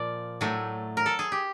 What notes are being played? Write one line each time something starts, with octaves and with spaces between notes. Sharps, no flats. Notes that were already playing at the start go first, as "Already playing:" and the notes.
Already playing: A#2 F3 D5
A2 F#3 A3
A#4
A4
G#4
G4